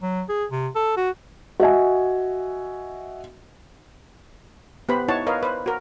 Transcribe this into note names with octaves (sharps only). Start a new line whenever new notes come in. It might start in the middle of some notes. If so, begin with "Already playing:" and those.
F#3
G#4
C3
A4
F#4
F#4 D#5 E5 G#5
B3 G4 B4 C5 B5
D#4 E4 C#5 F#5 A5
A#4 B4 C#5 D#5 F5
B4 C5
F#4 A#4